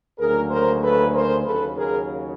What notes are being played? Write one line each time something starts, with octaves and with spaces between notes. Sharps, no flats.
D2 C#3 F#3 A#3 G#4 A#4
A#4 C5
A4 B4
A#4 C5
D#2 C#3 F#3 A4 B4
G#4 A#4